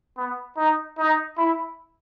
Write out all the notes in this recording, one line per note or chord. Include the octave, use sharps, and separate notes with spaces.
B3
D#4
D#4
E4